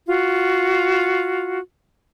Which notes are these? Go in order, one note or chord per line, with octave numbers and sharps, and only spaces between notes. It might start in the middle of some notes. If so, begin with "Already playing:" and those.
F4 F#4